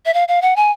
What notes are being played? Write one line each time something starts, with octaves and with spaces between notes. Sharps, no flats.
E5
F5
F5
F#5
G#5